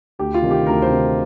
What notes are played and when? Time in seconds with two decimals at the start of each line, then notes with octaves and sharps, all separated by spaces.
0.19 D2 G4
0.34 F4
0.42 C3 D#3
0.51 G4
0.66 D2 A#4
0.82 C5
0.89 C3 D#3